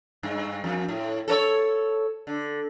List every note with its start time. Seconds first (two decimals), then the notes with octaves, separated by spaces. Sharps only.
0.23 G2
0.64 F2
0.88 A2
1.28 A4 A#4 C#5
2.27 D3